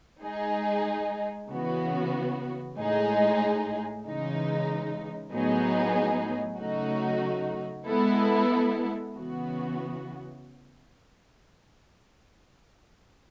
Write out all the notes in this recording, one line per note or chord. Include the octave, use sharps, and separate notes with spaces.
G#3 D#4 G#4
C#3 E3 B3 F#4
A2 G#3 D#4 G#4
C#3 E3 G#3 D#4
A2 F#3 B3 D#4 G#4
C#3 F#3 A3 D#4 F#4
G#3 B3 E4 A4
C#3 E3 B3 F#4